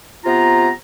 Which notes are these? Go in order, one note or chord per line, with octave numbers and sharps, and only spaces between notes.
C3 B3 F4 A#5